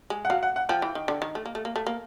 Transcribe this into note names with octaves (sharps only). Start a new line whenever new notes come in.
G#3
F#5
F#3 F5
F#5
F#5
F3 G5
E3
D#3
D3
D#3
A3
A#3
A3
A#3
A3
A#3